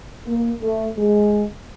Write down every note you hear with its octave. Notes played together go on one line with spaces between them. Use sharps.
A#3
A3
G#3